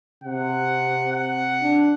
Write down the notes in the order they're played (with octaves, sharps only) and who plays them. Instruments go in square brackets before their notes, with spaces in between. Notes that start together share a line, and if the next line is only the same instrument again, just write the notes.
[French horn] C3 [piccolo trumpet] F#5
[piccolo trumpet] F#5
[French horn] D4